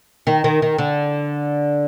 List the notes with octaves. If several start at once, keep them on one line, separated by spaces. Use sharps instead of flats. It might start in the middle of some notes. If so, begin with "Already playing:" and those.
D#3
D#3
D#3
D3